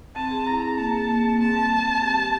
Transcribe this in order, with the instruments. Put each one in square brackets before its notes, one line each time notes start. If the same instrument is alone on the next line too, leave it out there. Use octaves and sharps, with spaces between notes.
[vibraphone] C4 [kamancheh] A5
[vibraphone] G#4
[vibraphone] E4 [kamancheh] A#5
[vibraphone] G#4
[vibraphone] A#3 [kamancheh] A5
[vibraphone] A#3
A#3
A#3
[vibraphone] C4 [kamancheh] A5
[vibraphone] G3
C4
C4
G4
G4